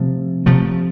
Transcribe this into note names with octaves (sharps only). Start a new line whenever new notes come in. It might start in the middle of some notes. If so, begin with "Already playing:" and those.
Already playing: C3 F3 A3
C3 F3 A3